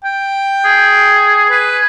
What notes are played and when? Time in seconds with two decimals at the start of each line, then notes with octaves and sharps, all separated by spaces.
0.04 G5
0.65 G#4
1.50 B4 G#5